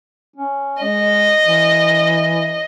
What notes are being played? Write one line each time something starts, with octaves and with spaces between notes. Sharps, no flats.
C#4
G#3 D#5
E3